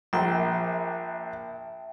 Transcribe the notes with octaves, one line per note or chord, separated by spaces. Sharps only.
A#1 E5 G5 A5